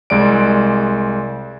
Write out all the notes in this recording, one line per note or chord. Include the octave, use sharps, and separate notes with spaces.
C2 G#3 D5 D7